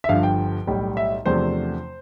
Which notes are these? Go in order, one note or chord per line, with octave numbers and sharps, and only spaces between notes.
E5
G1 G2 F3 F5
G5
B1 A2 G3
E5
E2 C3 F3 A3 D4 C5